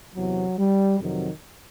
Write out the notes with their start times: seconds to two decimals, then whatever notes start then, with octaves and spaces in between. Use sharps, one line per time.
0.14 E2 C3 E3 F#3
0.58 G3
0.99 F2 C3 D#3 F#3